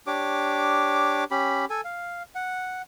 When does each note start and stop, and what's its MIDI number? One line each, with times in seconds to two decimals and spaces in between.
0.07 1.24 62
0.07 1.24 67
0.07 1.24 73
0.07 1.24 86
1.31 1.65 61
1.31 1.65 67
1.31 1.65 83
1.70 1.81 69
1.70 1.81 80
1.85 2.23 77
2.35 2.82 78